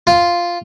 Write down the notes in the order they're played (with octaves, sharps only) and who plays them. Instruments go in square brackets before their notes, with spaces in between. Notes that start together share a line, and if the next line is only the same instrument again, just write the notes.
[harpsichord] F4